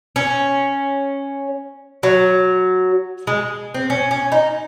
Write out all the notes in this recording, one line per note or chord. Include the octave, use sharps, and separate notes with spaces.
C#4
F#3
G#3
C4
C#4
C#4
D#4